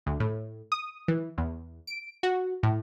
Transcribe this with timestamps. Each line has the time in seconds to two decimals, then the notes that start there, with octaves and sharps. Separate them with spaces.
0.06 D2
0.20 A2
0.72 D#6
1.08 E3
1.38 E2
1.87 D7
2.23 F#4
2.63 A2